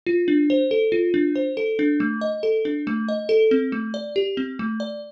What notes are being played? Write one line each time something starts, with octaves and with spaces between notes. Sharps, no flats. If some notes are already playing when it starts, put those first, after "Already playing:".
F4
D4
C5
A4
F4
D4
C5
A4
D4
A3
D#5
A4
D4
A3
D#5
A4
C4
A3
D5
G4
C4
A3
D5